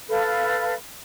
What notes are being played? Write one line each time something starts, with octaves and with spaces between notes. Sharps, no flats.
A4 B4 F5 B5